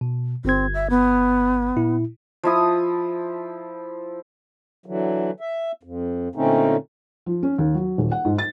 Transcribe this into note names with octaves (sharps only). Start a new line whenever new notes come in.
B2
G1 C4 G#6
E5
B3
A#2 E4
F3 E4 D#6
D3 E3 F#3
E5
F2
A#2 D3 A3 C4 C#4 D#4
F3
C#4
D#2
F#3
D#1
F#5
G#2
A6